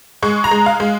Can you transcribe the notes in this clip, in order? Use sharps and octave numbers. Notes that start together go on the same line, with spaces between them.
G#3 C#6
A#5
G#3
F5
G#3